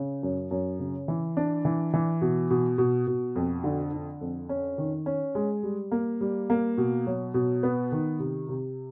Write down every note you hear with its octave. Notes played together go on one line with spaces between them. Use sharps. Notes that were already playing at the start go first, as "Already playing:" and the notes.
Already playing: C#3
F#2
F#2
C#3
E3
D4
E3
E3
B2
B2
B2
B2
F2
D3
D3
F2
C#4
D#3
C#4
G#3
G3
A#3
G3
A#3
B2
F#3
B2
B3
D#3
C3
C3